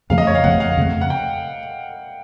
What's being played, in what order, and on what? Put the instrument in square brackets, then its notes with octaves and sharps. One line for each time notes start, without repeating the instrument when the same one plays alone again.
[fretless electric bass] F2 C#3 F3 A3 [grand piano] F5
[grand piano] D#5
C#5
F5
[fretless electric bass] F2 C#3 F3 A3 [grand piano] F#5
[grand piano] F5
[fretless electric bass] F2 C#3 F3 A3
[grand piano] F#5
G5